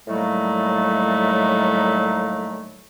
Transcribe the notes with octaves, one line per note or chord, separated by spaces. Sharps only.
A2 D#3 F#3 G3 A3 A#3